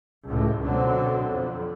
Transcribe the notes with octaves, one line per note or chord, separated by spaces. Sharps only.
C#2 A2
B2 D3 F#3 C4
F2